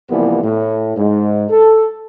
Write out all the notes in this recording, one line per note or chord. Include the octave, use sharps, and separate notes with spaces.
C2 E3 F3 G3 A#3 B3
A2
G#2
A4